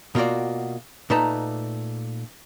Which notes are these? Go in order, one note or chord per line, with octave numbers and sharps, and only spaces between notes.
B2 A#3 F4 F#4 D5
A#2 A3 D#4 B4 A5 A#5